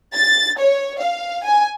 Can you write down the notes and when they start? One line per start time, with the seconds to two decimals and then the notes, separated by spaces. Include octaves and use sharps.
0.13 A6
0.58 C#5
1.00 F5
1.44 G#5